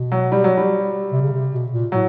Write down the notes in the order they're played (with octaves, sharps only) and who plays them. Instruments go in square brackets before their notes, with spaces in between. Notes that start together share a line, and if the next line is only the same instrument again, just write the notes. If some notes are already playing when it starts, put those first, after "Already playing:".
Already playing: [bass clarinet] B2
[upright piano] F#3
G3
F#3
G3
[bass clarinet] C3
C#3
C3
B2
A#2
[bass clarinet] A2 [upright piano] F#3